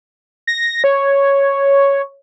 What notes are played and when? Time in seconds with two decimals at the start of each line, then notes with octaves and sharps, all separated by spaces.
0.47 A#6
0.84 C#5